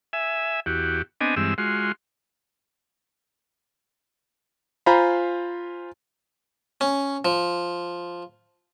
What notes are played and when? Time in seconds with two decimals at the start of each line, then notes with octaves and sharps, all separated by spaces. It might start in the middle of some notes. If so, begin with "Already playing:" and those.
0.13 E5 G#5
0.66 E2 F#4 G4
1.21 B3 C4 D4 D#5 G#5
1.36 G2 E3 G#3 C4 E6
1.58 G#3 F4 F#4 C6
4.86 F4 C5 G#5 A#5 B5
6.81 C#4
7.25 F3